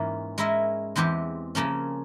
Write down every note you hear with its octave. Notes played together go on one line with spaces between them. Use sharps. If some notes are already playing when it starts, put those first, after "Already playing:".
Already playing: G#2 E3 A#3 C#4 F4
G#3 C#4 E4 A#4 E5
E2 E3 G#3 C4 G4
C#3 F3 A#3 C#4